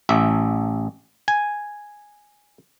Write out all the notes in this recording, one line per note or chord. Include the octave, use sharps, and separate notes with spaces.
A1 E5
G#5